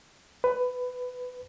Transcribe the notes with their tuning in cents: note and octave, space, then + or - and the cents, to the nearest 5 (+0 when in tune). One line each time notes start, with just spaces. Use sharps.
B4 +15